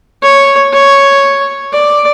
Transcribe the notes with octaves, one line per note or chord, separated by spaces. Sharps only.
C#5
C#5
D5